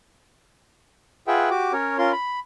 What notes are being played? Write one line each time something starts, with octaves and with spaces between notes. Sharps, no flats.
F4 G#4 B4 E5 F#5 G5
F#4 G4 D6
C#4 A#4 C#5
C#4 F4 A#4 C6
B5